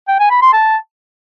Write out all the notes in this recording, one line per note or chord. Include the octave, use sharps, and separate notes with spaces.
G5
G#5
B5
C6
A5